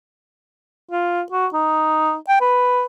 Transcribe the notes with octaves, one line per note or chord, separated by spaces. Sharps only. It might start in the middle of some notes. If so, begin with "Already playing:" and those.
F4
F#4
D#4
G5
B4